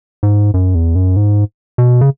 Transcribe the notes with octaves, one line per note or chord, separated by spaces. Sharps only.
G#2
F#2
E2
F#2
G#2
B2
C#3